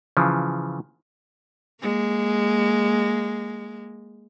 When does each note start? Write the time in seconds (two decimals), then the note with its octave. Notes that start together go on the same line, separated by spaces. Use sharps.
0.17 C#3 E3 F3
1.80 G#3 A#3